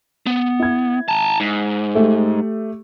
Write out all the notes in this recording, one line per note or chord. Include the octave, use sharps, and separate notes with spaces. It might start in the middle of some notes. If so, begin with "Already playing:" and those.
B3
E4 G#6
A5 A#5
G#2
A3 G4 A4